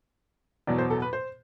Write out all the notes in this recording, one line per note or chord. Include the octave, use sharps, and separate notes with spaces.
E2 B2 F#3 D5
C5
A4
B4
C5